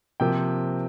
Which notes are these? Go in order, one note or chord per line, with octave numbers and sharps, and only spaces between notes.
C3 F3 A#3 G5